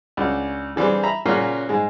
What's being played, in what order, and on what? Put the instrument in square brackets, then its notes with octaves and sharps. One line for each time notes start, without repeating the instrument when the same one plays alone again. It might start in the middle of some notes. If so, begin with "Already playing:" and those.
[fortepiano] C#2 D4 F#4
D3 E3 G3 C4 G#4
E5 A#5 B5
A#2 C#3 F#3 A#3 C#4
G#2 G#3